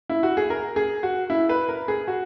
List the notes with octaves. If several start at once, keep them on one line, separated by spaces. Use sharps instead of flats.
E4
F#4
G#4
A#4
G#4
F#4
E4
B4
A#4
G#4
F#4